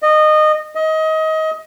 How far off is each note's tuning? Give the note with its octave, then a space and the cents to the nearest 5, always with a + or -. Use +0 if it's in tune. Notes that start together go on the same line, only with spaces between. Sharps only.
D#5 -20
D#5 +25